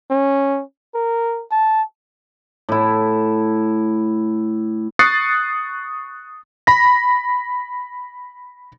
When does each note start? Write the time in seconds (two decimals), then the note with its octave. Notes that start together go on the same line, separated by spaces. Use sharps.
0.11 C#4
0.94 A#4
1.51 A5
2.69 A2 E4
4.99 C#6 D#6 F#6 A6 C7 C#7
6.67 B5 A#6